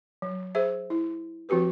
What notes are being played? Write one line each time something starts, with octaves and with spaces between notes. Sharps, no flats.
F#3
G#4 C5 E5
E4
F3 C4 F#4 G4 B4